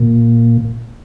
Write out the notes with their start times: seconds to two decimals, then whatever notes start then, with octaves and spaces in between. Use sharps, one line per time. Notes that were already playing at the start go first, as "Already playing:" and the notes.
Already playing: A#2